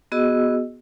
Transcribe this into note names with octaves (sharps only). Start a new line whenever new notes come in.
B3 F#4 G#4 D#5 E6